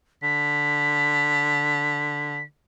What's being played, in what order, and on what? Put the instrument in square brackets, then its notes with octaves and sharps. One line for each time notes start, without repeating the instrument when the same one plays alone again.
[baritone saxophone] D3 [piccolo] B6